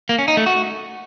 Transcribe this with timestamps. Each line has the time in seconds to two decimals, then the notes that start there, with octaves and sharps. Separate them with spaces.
0.09 A#3
0.19 C#4
0.28 D#4
0.37 A3
0.46 F#4